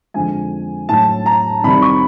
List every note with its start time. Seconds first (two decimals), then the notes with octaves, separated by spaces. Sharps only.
0.14 F2 D3 F3 G#3 G#5
0.89 A2 F#3 A5
1.26 A#5
1.64 C2 C3 D#3 G3 B5
1.82 C#6